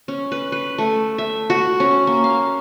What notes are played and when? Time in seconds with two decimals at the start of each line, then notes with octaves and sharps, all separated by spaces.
0.08 C#4
0.32 B4
0.52 B4
0.78 A3
1.18 E5
1.50 F#4
1.80 C#4
2.07 A#3
2.24 F5